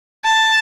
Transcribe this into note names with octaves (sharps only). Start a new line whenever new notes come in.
A5